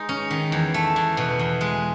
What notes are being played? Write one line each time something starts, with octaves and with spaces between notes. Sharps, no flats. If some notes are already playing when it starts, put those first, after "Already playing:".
Already playing: G#3 D#4
C#4
D#3
E2
A3
E2
B2
E2
G#3